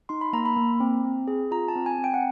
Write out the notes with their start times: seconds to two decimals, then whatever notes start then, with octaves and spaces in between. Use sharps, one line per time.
0.09 D#4 C6
0.21 B5
0.33 A#3 A#5
0.45 B5
0.56 A#3
0.80 C4
1.05 C4
1.28 G#4
1.51 F4 A#5
1.68 A5
1.75 C4
1.86 G#5
1.98 C4
2.04 G5
2.14 F#5